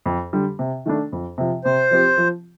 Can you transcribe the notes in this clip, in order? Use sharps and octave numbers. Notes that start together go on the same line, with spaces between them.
F2
D3 G3
C3
D#3 A3 D4
F2
C3 F3
C3 C5
F3 C4 G4
F3